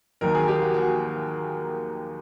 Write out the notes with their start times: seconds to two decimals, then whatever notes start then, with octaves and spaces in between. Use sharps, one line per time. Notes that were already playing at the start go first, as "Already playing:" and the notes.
0.21 D#2 D#3 F#3 A#4
0.35 G#4
0.48 G4
0.62 F#4
0.74 F#4